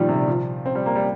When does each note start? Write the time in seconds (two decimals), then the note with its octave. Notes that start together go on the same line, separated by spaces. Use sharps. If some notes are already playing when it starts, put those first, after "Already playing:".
Already playing: A#2 D#3 F3 G3
0.09 C3
0.28 F3
0.66 C4
0.75 G3
0.86 A#3
0.96 G3